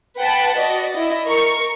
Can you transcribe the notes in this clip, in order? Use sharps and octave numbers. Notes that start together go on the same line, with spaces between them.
B4 F#5 G5 A5 B5
F#4 D5 D#5
E4 D#5
A#4 C#6